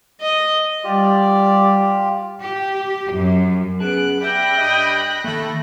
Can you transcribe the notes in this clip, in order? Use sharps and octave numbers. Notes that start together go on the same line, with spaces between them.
D#5
G3 F4 G4 D5
G4
F#2
B3 C#4 G#4 A5 F#6 D7
G4 D5 E5 G5 B5 F#6 A#6
G2 G4 D#5
D#3 A3 A#3